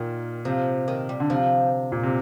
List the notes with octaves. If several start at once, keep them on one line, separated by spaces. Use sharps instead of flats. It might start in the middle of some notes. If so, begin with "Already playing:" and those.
Already playing: A#2 D#3
C3 F3
D#3
G3
D3
C3 F3
A#2
C3